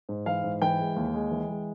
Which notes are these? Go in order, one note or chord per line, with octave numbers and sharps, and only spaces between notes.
G#2
E3 F5
G#2
E3 G5
G#3
D#2
G#3
E3
G#3